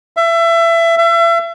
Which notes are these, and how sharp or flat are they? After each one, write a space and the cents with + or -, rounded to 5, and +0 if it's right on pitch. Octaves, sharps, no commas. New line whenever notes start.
E5 +25
E5 +35